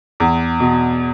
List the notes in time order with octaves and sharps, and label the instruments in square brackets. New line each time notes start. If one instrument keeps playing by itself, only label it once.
[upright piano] E2
B2